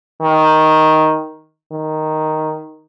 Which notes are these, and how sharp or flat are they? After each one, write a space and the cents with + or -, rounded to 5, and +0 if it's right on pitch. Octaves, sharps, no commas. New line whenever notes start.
D#3 +5
D#3 +0